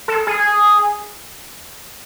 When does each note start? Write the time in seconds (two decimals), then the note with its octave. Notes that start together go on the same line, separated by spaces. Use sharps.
0.08 A4
0.27 G#4